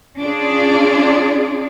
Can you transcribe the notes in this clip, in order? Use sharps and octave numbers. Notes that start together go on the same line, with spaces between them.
C#4 D4 F4 G#4 D5